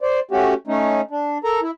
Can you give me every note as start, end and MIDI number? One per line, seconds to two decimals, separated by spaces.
0.01 0.20 72
0.01 0.20 74
0.31 0.54 57
0.31 0.54 61
0.31 0.54 66
0.31 0.54 67
0.67 1.01 57
0.67 1.01 61
0.67 1.01 63
1.11 1.38 62
1.44 1.60 69
1.44 1.60 70
1.44 1.60 82
1.61 1.71 64